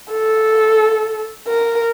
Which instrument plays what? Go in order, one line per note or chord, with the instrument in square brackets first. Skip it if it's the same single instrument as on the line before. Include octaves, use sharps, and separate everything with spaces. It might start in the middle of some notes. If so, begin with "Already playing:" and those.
[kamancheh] A4
A#4